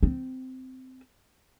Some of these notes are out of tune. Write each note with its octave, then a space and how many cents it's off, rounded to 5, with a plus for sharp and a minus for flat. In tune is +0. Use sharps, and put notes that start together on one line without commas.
C4 -15